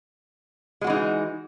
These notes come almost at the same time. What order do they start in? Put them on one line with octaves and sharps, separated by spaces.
G#3 F#4 E3 D#4